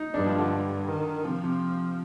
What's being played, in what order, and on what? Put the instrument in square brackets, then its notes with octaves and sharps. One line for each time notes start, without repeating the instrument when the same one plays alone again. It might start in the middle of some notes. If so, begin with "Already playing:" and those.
Already playing: [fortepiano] D#4
[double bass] G2 [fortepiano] D4
[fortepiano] F3
D3
[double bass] D#3
[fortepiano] C3 [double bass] F3
[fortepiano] C3